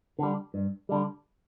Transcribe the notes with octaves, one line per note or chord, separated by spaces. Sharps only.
D3 G3
G2
D3 G3